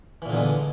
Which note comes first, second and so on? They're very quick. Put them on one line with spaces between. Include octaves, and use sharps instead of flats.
E3 A#2 D3 B3 G#3